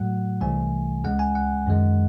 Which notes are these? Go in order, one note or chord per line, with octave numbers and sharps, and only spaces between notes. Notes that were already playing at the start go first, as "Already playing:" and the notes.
Already playing: A2 F#3 A3 F#5
C2 C3 E3 A3 G#5
C#2 C#3 G#3 F#5
G#5
F#5
F#2 D#3 G#3